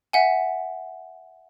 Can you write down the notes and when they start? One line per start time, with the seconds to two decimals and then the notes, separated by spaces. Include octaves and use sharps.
0.13 E5 F#5 G#5